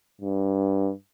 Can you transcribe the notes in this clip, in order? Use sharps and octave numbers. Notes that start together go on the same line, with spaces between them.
G2